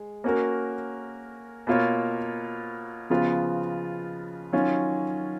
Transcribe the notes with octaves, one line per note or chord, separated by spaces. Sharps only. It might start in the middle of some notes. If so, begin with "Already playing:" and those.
Already playing: G#3
A#3 C#4 F#4 A#4
B2 A#3 F4 A#4 C#5
C#3 F3 B3 F4
D#3 F#3 C#4 F4